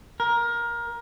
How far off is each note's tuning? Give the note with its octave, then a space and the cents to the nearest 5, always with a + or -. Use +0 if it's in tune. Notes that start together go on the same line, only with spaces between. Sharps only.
A#4 +20